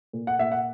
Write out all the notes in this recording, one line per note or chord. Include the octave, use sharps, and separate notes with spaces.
A#2
F#5
A#2 E5
F#5